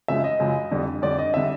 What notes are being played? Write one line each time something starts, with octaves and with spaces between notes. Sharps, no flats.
F#2 C#3 F3 G#3 E5
D#5
F#2 C#3 F3 G#3
F2 D3 G3
F2 D3 G3 D5
D#5
D3 G3 E5